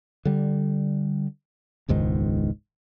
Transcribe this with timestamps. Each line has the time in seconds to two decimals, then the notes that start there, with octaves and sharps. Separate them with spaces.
0.25 D3 G3
1.88 E1 C#2 G#2 D#3